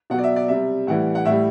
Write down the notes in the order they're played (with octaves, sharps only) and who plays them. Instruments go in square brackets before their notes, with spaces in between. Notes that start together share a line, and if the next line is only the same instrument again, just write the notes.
[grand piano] B2 F#5
F#3 D5
E5
D5
C3 G3 E5
A2 E3 G3 F#5
F#5
A2 E5
G3